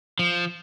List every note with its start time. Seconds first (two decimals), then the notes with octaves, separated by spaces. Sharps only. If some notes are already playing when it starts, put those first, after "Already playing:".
0.19 F3